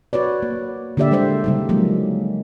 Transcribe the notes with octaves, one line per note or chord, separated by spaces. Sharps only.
F#4 B4 C#5 D5
A#3
D3 A#3 G4 D5 E5
G3 G#3 A#3 C5 E5
C#3 G3 D#4
F3 F#3 G#3 A#3